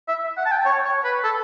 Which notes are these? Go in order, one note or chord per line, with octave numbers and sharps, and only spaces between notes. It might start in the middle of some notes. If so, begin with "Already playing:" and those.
E5
F#5
A5
G5
C#5
C#5
B4
A4